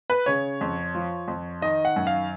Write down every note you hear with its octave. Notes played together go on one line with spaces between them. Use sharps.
B4
C#3 C#5
F2
F3
F2
D#3 D#5
F#5
F#2
F5